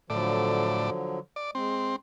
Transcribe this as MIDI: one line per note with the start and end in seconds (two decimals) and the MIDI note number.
0.10 0.90 45
0.10 1.19 50
0.10 1.19 53
0.10 1.19 54
0.10 0.90 74
1.36 1.51 74
1.55 1.94 56
1.55 1.96 60